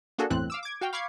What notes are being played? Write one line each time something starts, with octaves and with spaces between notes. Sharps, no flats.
A#3 D4 F#4 G#4 A4
G1 E2 A2 E3 C4 F#6
F5 D6 E6
D6 G#6
F#4 F5 G5
F5 B5 C#6 D6 G#6 C7